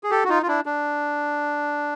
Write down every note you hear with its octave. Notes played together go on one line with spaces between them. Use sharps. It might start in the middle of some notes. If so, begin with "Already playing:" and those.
G#4
G4 A4
F#4
D#4 F4
F4
D4 E4
D4